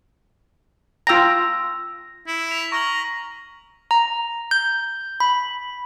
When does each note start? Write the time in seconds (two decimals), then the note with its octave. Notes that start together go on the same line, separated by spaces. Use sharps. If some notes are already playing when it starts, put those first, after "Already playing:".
1.07 F4 G5 A#5 E6 A#6
2.27 E4
2.51 B6 F7
2.72 A#5 C#6 F6 F#7
3.91 A#5
4.51 G6
5.20 B5